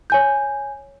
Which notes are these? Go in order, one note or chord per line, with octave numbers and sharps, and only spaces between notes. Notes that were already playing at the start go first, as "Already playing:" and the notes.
C#5 G#5 G6